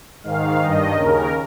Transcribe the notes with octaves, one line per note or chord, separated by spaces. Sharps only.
G#2 D#3 F5
G2 D#3 D#5
D#2 C#3 A#4